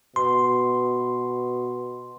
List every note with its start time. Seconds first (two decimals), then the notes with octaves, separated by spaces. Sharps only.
0.16 B2 C6